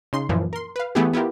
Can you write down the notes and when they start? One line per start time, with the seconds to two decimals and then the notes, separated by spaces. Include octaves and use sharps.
0.13 C#3 D#4 C6
0.29 F#2 A#2 E3 F3
0.53 A#4 C6
0.76 B4 F5
0.95 E3 A3 B3 E4 G4 G#4
1.14 B3 E4 F4 G4 A#4